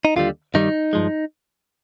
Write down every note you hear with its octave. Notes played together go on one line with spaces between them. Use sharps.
D#4
D#2 D3 G3 F4
G2 D#3 G3 D#4
G2 F3 G#3